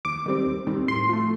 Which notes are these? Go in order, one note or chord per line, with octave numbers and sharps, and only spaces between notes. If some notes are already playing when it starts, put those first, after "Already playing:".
D#2 D6
D#3 G3 C4
D#2
D#3 G3 C4
A2 C6
F3 A3